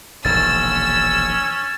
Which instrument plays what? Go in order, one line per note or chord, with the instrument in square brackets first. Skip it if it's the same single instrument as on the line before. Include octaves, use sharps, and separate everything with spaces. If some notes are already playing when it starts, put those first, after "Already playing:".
[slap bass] E1 A#1 D#3 [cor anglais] C#4 [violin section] E6 [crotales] A6